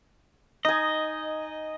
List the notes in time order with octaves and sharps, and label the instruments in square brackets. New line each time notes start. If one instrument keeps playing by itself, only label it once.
[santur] D#4 G#5 [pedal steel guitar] D#5